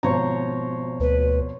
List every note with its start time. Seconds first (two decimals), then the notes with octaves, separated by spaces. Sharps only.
0.03 G#1 B2 F3 C5 C#5 A#5
1.00 D2 B4